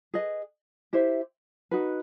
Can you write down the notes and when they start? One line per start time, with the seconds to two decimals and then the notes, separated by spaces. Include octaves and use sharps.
0.14 G#4 B4 D#5
0.93 E4 G4 C5 E5
1.71 D#4 F#4 B4